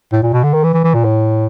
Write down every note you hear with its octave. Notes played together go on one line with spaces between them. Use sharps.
A2
A#2
B2
D3
D#3
E3
E3
E3
A#2
A2